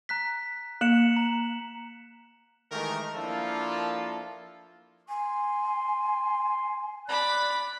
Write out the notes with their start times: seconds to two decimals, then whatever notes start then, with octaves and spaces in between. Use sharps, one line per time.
0.09 A#5 F#6 B6
0.81 A#3 C#7 E7 F#7
1.16 A#5
2.72 D#3 E3 G#3 A3 G4 A#4
3.15 F3 A#3 D4 E4 F4 A4
5.09 G#5 C6
7.08 D5 B5 D6 F#6